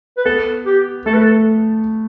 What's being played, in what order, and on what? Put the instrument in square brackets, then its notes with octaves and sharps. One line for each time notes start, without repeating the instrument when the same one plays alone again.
[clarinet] B4
[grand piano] B3 [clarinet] A4
[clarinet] G4
[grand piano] A3 [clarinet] A4
[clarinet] B4
A4